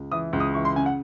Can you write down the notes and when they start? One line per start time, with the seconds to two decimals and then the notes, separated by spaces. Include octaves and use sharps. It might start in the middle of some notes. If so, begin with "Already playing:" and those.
Already playing: C#2
0.12 E3 D#6
0.33 C#2
0.40 D#6
0.54 E3 C#6
0.65 C6
0.76 C#3 G#5
0.86 F#5